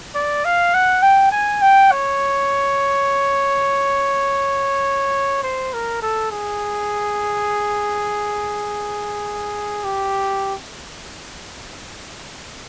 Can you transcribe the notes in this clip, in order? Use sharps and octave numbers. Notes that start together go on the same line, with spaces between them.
D5
F5
F#5
G5
G#5
G5
C#5
C5
A#4
A4
G#4
G4